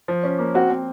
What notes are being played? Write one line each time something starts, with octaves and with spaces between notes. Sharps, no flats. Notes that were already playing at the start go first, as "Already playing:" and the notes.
F3
C#4
A#3
C4 F#4
C4